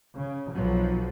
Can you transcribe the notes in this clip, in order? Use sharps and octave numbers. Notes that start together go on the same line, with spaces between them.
C#3
B1 F3 F#3